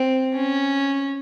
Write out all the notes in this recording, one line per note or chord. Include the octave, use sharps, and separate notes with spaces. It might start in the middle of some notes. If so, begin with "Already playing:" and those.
Already playing: C4
C#4